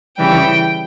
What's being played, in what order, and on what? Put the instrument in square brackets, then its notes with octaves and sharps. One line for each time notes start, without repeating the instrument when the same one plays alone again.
[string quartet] C#3 E3 G3 G5